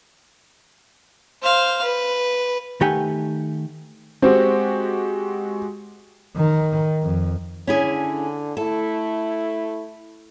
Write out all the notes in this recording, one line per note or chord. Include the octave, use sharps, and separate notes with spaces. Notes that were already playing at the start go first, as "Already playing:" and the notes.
C5 F5
B4
D#3 A3 G4 F#5 G#5
G#3 C4 F#4 G4
D#3
F2
D3 C#4 E4 G#4
A3 E4 A4